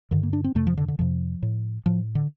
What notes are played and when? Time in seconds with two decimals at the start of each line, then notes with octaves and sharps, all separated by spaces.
0.11 G2 D3 D#3
0.23 A#3
0.33 D4
0.44 C4
0.55 F2 C3 A3
0.67 F3
0.77 D3
0.88 D3
0.99 F2 C3 F3
1.42 A2
1.86 A2 F3
2.15 D3